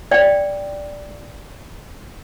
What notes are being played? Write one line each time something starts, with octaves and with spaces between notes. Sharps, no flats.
D5 G5